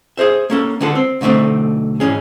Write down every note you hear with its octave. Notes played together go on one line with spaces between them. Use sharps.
G#4 A#4 C5 E5
A#3 C#4 A4
D3 G#3 B3 F4 A4
C4
B1 D3 A3 C4 D#4
G#2 E3 C#4 G#4